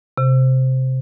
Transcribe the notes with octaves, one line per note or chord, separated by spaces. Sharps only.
C3